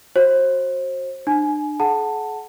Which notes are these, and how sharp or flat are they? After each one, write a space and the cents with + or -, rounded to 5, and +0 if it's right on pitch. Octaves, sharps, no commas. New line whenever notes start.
F#4 +0 C5 +30
D4 +35 G#5 +25
G#4 +45 F#5 +0 A5 +15